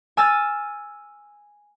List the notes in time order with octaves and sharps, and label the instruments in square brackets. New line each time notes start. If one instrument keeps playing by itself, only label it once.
[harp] G#5 E6 F6 G#6 A6